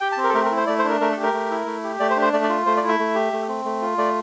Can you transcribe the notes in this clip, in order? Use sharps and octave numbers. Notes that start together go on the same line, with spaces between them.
G4 G5
A5
C4
A#4
A4
A3 A#4
A#4
E4
C5
A3 D5
C5
D4 A#4
A3 A#4
A4
G4
A#4
A3
E4
A3
G4
A3 D5
C5
D4
C5
A3 D5
D5
F4
A3 C5
D5
E4
E5
A3
G4
A3
C4
A3
F4
A3 D5